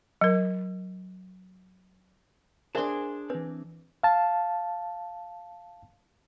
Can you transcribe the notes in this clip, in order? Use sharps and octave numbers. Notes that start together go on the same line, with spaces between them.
F#3 A#4
D4 G#4 A#4 C5 E5 A5 C6
E3 C4 B4
F5 A5